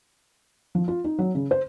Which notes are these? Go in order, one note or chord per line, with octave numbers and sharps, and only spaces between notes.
F3
F4
D#4
F#3
C#3
C5